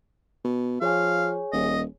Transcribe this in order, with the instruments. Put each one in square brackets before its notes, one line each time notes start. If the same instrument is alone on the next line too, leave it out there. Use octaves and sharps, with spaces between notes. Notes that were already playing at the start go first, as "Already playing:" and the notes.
[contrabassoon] B2
[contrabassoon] F3 [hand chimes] G#4 C#5 G#5 [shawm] F5
[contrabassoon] D#1 [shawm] D#5